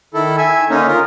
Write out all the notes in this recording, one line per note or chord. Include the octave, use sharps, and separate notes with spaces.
D#3 E4 A4
E5 G#5
D3 A#3 C#4 D#4
F4 A#4